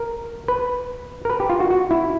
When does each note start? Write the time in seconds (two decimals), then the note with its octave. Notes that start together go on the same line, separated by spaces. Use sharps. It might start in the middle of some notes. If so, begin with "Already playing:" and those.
Already playing: A#4
0.48 B4
1.25 A#4
1.30 B4
1.40 G4
1.50 F4
1.60 F#4
1.70 F#4
1.91 E4